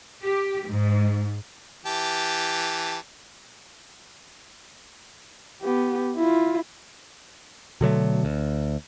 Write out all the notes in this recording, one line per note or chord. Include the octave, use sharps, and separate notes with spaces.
G4
G#2
E3 G4 A5
B3 G4
E4 F4
B2 D3 F#3 A3
D2